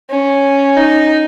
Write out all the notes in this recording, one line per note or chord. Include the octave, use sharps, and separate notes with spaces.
C#4
D#4